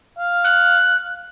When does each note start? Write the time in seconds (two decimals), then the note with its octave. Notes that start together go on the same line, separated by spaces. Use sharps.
0.17 F5
0.44 F#6